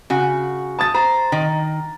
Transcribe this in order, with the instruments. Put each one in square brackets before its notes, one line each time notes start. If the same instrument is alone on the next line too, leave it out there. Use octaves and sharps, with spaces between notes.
[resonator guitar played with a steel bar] C#3 F#4
[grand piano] A5 D#6 A6
[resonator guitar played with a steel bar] C5 [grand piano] A#5
[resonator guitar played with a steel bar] D#3